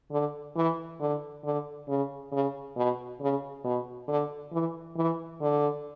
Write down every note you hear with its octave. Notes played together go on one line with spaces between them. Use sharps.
D3
E3
D3
D3
C#3
C#3
B2
C#3
B2
D3
E3
E3
D3